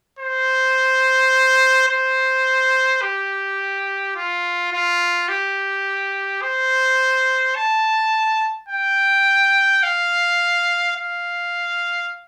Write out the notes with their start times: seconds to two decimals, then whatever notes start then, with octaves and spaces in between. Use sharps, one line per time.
0.19 C5
1.88 C5
3.02 G4
4.16 F4
4.73 F4
5.28 G4
6.42 C5
7.56 A5
8.69 G5
9.83 F5
10.97 F5